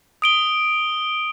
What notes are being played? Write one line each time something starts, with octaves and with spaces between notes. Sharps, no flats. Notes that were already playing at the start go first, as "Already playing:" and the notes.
D#6 D7 G7